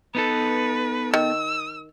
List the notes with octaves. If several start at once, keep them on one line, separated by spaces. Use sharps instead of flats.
B3 D#4 A4 B4
D#3 E6